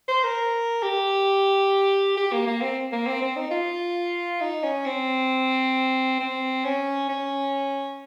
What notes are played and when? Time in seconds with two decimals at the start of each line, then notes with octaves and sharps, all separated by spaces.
0.08 C5
0.23 A#4
0.83 G4
2.17 G4
2.32 A#3
2.47 A#3
2.62 C4
2.92 A#3
3.07 C4
3.22 C4
3.36 D#4
3.51 F4
4.41 D#4
4.64 C#4
4.86 C4
6.20 C4
6.65 C#4
7.09 C#4